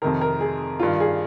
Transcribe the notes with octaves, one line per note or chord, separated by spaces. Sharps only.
F2 C3 D#3 A#4
A#4
G#4
G2 D#3 F4
G#4